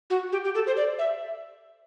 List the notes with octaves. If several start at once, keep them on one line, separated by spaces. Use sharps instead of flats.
F#4
G4
G4
A4
C5
D5
E5